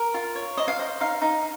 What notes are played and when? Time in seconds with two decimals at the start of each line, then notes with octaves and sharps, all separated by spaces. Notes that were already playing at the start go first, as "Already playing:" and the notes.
Already playing: A#4
0.14 F4
0.35 C#5
0.57 C5 D#5
0.68 F5
0.79 C5 D#5
1.01 D#4 F5
1.22 D#4